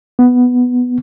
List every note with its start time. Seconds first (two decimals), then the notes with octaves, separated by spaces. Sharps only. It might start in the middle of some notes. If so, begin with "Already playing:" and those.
0.19 B3